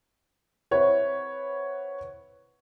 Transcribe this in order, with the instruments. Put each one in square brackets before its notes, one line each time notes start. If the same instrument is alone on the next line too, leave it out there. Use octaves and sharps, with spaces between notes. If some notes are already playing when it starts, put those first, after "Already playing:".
[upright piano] C4 E4 B4 C#5 F#5